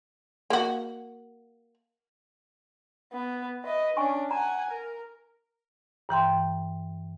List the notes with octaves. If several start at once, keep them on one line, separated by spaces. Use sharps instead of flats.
A#3 F#4
B3
B4 D#5 E5
C#4 D4 G#5 C#6
F#5 G#5 A#5
A#4
G2 E3 G5 C6